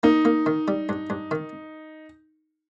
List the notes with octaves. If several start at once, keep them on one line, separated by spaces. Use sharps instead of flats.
A#3 D#4
A#3
D#3
G3
G2
G2
D#3